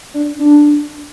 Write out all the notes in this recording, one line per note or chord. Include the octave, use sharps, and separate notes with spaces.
D4
D4